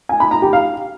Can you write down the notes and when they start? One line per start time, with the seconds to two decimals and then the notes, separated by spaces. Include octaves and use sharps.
0.09 G#5
0.20 B5
0.31 A#5
0.42 G4
0.53 F5